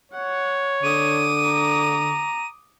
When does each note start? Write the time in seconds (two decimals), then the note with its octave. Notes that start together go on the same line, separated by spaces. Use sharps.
0.12 C#5 F#5
0.83 D3 D6 D#6 D#7
1.45 A#5